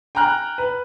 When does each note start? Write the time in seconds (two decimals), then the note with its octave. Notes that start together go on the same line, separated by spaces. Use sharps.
0.15 G5 G#5 A#5 F6 F#6
0.58 B4